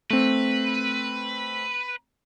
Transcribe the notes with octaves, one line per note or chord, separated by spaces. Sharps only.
A3 C4 B4